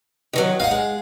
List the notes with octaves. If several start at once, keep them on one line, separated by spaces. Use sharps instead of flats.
D#3 E3 F#3
D#4 F5 F#5
G#3